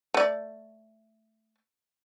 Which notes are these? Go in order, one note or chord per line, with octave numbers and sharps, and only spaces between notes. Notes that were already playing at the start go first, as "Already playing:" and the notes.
A3 D5